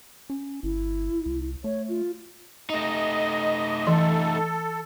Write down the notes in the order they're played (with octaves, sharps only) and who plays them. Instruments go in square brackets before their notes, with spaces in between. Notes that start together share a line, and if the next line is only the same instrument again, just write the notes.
[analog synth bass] C#4
[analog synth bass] G1 [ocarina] E4
[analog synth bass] C2
[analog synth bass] A3 [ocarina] C#5
[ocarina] F4
[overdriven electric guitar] A3 D#4 [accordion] D#5
[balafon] E3 C6 [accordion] A4